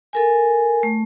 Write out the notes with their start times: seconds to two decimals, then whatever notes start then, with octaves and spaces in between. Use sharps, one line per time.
0.13 A4 A#4 G#5
0.83 A3